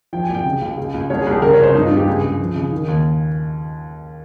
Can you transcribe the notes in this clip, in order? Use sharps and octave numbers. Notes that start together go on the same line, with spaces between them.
F3 G5
G#5
C2
G5
C#3
C#2
C#2
C#2
C2 C#5
G#4
C2 G4
C#3 A#4
C#5
C#2
C5
G2 D#4
F4
G2
G4
C#2 G#4
C#2
F3
C#3
D#3
D#2